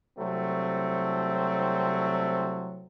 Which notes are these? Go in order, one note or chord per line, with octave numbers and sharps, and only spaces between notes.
C2 F#3 A3 C4